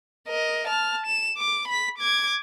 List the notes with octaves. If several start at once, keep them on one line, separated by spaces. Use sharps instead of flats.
A#4 D#5
A5 F6
E7
D6
B5 B6
D6 G#6